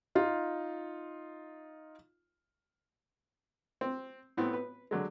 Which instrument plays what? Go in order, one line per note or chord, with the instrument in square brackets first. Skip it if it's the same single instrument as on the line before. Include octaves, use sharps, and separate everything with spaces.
[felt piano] D#4 F4
[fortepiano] C4
A2 B3 C4
B4
D3 F#3 G#3